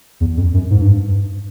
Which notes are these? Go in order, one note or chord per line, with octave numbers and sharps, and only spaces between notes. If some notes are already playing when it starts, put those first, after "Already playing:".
E2
F2
F#2
G#2
G2